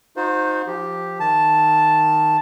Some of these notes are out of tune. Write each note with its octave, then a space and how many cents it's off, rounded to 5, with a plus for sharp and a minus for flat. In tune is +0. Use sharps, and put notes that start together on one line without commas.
D#4 +0 F#4 -45 C5 +0
F3 +0 G4 +0
D#3 +0 A5 +0